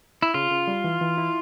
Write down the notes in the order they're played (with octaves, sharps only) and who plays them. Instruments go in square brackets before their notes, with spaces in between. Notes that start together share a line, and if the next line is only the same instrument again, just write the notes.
[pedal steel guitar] E4
[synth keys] C#3 [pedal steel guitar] F4
[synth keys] C#3
G3
E3
E3
E4